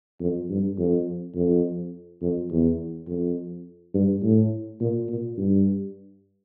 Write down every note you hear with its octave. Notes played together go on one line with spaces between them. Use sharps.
F2
G2
F2
F2
F2
E2
F2
G2
A2
A#2
A#2
G2